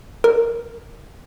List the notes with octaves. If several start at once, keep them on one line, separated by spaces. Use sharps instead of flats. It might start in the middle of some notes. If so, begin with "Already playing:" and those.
A#4